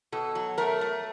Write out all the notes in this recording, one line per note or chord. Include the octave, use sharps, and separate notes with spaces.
B2 A4
F#3
A3 A#4
A3